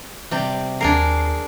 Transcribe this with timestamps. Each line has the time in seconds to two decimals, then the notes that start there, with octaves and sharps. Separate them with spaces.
0.31 C3 G3
0.81 D#2 D4 G#4 A#4 C7